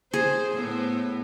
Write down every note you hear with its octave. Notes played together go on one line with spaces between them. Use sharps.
G#4 C5
A2 B3